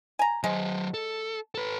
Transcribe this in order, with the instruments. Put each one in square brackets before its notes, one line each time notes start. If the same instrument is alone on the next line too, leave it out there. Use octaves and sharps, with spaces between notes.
[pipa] G#5 A#5
[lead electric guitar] F#3 C5 [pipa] G#3
[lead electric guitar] A4
A4 B4